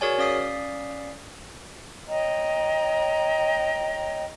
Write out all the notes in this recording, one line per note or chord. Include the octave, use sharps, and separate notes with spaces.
F#4 G#4 A#4 C#5 D5 G#5
C#4 D5 F5 D#6 B6 C7
C#5 D#5 G5 A#5